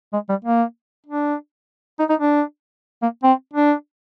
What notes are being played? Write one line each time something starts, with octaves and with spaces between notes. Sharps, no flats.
G#3
G3
A#3
D4
D#4
D#4
D4
A#3
C4
D4